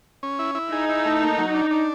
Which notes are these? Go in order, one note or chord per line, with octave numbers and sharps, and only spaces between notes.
C#4
E4
E4
D#4 G#4
E4
A3
A#3
F#3
D4
D4